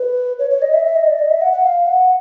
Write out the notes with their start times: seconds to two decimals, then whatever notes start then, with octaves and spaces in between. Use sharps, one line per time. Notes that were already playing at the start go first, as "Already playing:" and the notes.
Already playing: B4
0.39 C#5
0.50 C#5
0.62 D#5
0.73 E5
0.85 E5
0.96 D#5
1.07 D5
1.19 D#5
1.30 E5
1.41 F#5
1.53 F#5
1.64 F5
1.87 F#5